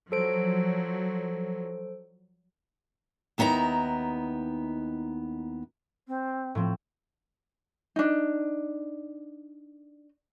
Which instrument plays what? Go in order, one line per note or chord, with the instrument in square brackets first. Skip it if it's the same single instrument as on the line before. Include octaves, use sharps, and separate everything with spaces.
[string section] F3 F#3 [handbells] A4 C5 D7
[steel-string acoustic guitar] D#2 B3 D#4 E4 A#5
[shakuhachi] C4
[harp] A2 F3 C4
[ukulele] D4 D#4